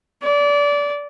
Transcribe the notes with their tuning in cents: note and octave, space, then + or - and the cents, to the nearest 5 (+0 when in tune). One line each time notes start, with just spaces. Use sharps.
D5 -25